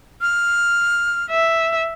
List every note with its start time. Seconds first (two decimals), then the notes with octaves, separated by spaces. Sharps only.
0.21 F6
1.30 E5